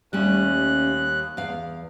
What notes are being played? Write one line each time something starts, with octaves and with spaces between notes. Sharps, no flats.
D#2 G3 A3 C#4 F#6
E2 F5